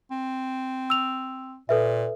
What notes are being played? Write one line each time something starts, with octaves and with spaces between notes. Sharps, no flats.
C4
E6 F7
A#2 A4 B4 E5